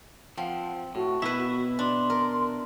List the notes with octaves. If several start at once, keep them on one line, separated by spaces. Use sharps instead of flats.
F3 C4 F#5
A2 F#4
B2 E4 B4 E5
D4 C6
A#4